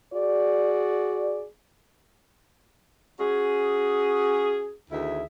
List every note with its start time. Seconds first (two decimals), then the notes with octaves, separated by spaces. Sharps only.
0.13 F#4 G#4 D5
3.20 C#4 F#4 G#4
4.91 D2 D#3 E4 G#4 E5